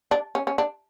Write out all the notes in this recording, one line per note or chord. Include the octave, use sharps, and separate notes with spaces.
D4
C#4
C#4
D4